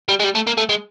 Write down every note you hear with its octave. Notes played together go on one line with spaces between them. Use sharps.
G3
G#3
G3
A3
A#3
A3
G#3